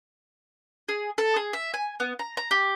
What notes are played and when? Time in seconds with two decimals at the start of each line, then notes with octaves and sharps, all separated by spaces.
0.89 G#4
1.18 A4
1.36 G#4
1.53 E5
1.74 G#5
2.00 B3
2.19 A#5
2.37 A#5
2.51 G4